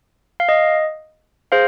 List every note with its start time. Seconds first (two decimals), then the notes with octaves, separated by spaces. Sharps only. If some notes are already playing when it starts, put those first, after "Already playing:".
0.40 F5
0.49 D#5
1.52 G#4 C5 F5